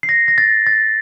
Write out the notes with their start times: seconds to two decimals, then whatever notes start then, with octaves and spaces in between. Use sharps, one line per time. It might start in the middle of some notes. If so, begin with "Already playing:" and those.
0.03 C7
0.09 A#6
0.28 A#6
0.38 A6
0.67 A6